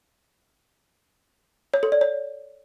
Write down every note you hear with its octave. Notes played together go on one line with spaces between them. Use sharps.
C#5
A4
D5
C#5